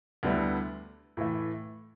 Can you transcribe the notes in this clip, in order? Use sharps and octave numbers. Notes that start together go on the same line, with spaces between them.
D2 D3 G3 B3 E4
A2 E3 A3